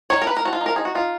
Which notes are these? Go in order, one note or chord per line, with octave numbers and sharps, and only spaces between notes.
D#3 C#5
A#4
A#3 B4
A#4
F3 F#4
F4
D#4
A#4
D#4 G#4
F#4
D#4 F4